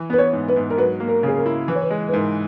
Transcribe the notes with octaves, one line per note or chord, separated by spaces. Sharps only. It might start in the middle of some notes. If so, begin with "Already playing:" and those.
Already playing: E3
B3 B4
C#5
G#2
B4
G#2
A#4
F#3 B4
A#3
A#4
C#3 G#4
A#4
E4
E3 B4
C#5
B4
G#3
B4
G#2 A#4